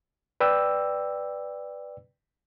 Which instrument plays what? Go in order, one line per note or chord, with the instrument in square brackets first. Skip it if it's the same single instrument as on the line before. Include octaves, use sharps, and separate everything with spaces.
[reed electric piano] B4 D5 G5 E6